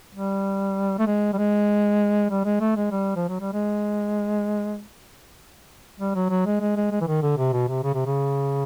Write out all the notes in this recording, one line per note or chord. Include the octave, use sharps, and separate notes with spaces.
G3
A3
G#3
G3
G#3
G3
G#3
A3
G#3
G3
F3
F#3
G3
G#3
G3
F#3
F#3
G#3
G#3
G#3
G#3
E3
D#3
D3
C3
B2
C3
C#3
C3
C#3